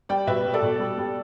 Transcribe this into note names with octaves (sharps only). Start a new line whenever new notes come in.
G3 D5 G5
B2 B4 E5
G3
A4 D5
B2
G3
G3